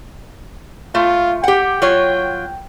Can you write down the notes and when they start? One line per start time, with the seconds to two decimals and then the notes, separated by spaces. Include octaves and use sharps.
0.95 A3 F4
1.44 G4 F#5 G5
1.82 F#3 F4 C#5